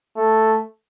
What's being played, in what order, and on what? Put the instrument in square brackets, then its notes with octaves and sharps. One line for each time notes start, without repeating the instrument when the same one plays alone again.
[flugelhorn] A3